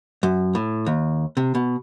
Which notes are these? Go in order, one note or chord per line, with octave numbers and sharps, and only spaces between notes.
F#2
A2
D#2
C3
B2